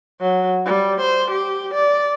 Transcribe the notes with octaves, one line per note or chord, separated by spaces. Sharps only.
F#3
G3
C5
G4
D5